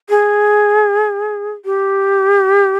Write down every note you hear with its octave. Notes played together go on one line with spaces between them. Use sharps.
G#4
G4